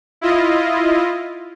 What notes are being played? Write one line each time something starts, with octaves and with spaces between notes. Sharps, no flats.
E4 F4 D#5